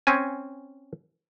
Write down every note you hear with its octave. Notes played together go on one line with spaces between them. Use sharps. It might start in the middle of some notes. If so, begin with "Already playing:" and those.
C4 C#4 G#5